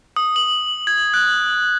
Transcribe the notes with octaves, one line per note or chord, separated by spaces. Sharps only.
D#6
F#7
G#6
F#6